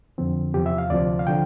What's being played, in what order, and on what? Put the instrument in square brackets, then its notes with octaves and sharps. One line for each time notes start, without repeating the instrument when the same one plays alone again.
[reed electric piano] F2 D3 F3 C4
E2 C3 F3 G4
E5
F5
D2 C3 F3 D5
F5
D3 F3 G5